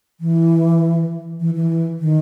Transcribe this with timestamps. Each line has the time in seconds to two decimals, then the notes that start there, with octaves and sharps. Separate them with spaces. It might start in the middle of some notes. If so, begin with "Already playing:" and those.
0.20 E3
1.40 E3
1.55 E3
1.99 D#3